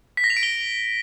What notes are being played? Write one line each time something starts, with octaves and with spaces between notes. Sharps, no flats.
B6
A#6
F7
D7
G7